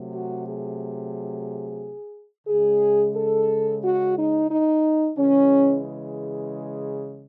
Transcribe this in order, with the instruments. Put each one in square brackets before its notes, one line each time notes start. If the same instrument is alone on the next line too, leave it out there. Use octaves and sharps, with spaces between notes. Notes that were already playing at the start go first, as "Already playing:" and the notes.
Already playing: [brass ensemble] C3 F#3 A3
F#4
G#4
C#3 G#3 G#4
A4
F#4
D#4
D#4
C#3 E3 G#3 C#4